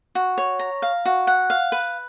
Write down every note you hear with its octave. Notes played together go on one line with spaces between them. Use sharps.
F#4
C#5
A#5
F5
F#4
F#5
F5
B4